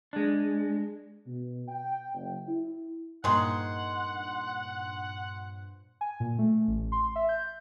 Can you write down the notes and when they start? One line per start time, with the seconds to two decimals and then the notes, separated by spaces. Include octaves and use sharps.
0.13 G#3 D4
1.27 B2
1.69 G5
2.14 F#1
2.48 E4
3.24 G2 A#2 D#3 G#3 C5 F#5 C6
6.01 G#5
6.20 A#2
6.39 A3
6.68 A1
6.92 C6
7.16 E5
7.29 G6